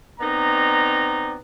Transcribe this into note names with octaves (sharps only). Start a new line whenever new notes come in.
B3 C4 D#4 D5 A#5